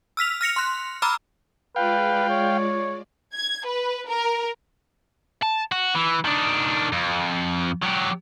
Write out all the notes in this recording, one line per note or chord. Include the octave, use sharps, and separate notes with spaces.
E6 F6 B6 F7
F6 A#6 C#7 F7
C6 F#6
A#5 B5 D6 E6 F6
G#3 F4 B4 D5 F5 G5
C#5
G#6
B4
A#4
A5
F#4
E3
D#3 D4
F2
F#3 G4